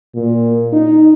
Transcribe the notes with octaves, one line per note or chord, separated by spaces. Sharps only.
A#2
D#4